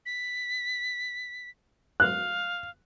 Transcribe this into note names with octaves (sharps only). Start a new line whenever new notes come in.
B6
F5 F#6